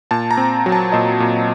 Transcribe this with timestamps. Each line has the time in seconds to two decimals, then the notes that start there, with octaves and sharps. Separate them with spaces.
0.11 A#2 A5
0.31 A#5
0.37 C4
0.66 F#3
0.72 A5
0.92 A#2 D#5
1.20 A#2